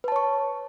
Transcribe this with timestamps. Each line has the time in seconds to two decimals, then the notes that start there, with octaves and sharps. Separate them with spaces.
0.04 B4
0.08 A5
0.12 C#5
0.16 C#6